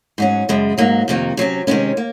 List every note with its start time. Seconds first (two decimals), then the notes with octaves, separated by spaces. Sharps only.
0.18 G#2 F#3 C#4
0.49 F#2 C#3 G#3
0.78 G#2 F#3 A#3
1.08 F2 C3 D#3 A#3
1.37 C3 F#3 C#4
1.67 C3 D#3 G#3 C#4
1.97 A#3